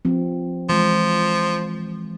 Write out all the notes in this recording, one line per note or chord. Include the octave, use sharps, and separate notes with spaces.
F3 C4
E3 F3 G#3